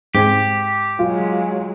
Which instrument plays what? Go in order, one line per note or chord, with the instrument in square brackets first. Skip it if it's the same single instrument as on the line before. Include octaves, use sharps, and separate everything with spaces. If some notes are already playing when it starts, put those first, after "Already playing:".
[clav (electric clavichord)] G#2 C4 G#5 [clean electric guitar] G4
[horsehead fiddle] F#3 G#3 [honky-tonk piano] F4